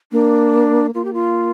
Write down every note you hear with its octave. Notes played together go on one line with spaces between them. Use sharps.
A#3 D4
A#3 F4
G4
F4